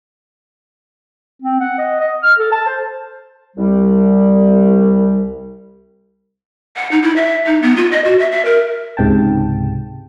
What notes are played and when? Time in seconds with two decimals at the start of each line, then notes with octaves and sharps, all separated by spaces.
1.42 C4
1.60 F#5
1.78 D#5
2.00 D#5
2.23 F6
2.39 A4
2.52 A5
2.66 C5
3.57 C2 G3
6.76 F#5
6.91 D#4
7.03 E4
7.16 E5
7.46 D#4
7.62 B3
7.76 F4
7.92 D#5
8.05 F#4
8.19 E5
8.32 E5
8.45 A#4
8.97 C#2 G#2 C3 G5 A5